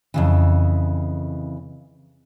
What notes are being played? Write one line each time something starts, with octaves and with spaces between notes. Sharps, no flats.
F2 C#3 E3